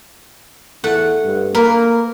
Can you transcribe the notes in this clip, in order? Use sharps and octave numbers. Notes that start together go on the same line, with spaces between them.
E2 A3 F#5
G2
A#3 A#4 B4